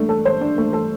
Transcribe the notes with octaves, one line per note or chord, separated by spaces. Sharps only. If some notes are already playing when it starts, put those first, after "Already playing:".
Already playing: A3 D4
A4
C5
D4
A3
A4